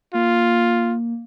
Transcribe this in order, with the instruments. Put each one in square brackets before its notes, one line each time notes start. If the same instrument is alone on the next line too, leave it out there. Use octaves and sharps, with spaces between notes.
[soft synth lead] A#3 [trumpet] F4